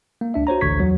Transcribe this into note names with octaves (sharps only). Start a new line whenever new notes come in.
A#3
C#2 D4 E5
F#4 C5 C#5 A#5
A1 D2 D3 C#6 G#6 B6
E2 F#3